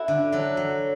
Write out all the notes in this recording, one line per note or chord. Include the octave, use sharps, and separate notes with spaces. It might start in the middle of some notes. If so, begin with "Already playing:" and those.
Already playing: E4 F#4 A4
D3
F#3 A4
F#3